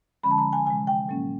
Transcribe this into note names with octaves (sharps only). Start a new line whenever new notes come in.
D3 F3 G#3 C#4 B5
A5
A#5
G#5
C3 E3 G#3 G#5
G5
A2 F#3 A#3 C#4